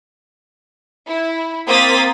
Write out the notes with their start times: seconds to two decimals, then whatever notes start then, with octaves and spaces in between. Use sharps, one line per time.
1.08 E4
1.66 A#3 C4 D#6 A6 B6